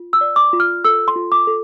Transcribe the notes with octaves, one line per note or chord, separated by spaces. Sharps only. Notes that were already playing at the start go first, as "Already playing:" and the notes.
Already playing: F4
E6
D5
D6
F4
F6
A4 E6
C6
F4
D6
A4